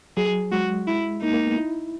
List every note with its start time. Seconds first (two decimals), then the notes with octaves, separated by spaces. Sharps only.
0.17 F#3 G#4
0.52 G#3 F#4
0.87 E4
1.22 A#3 D#4
1.33 A#3
1.46 B3
1.57 E4